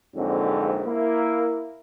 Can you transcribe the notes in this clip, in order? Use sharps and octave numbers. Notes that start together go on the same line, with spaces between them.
A#1 F2 G#2 D3 F#3 C4
A#3 E4